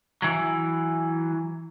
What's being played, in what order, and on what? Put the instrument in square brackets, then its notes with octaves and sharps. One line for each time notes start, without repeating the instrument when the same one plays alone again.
[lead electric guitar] E3 F#3